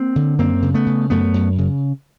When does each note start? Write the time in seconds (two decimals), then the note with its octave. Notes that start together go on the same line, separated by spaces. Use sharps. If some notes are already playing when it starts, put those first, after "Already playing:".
Already playing: A#3 C4
0.16 D3
0.39 F#2 A#3 C4
0.62 C#3
0.74 A3 B3
0.87 C#3
1.10 F#2 A3 B3
1.34 F#2
1.58 C#3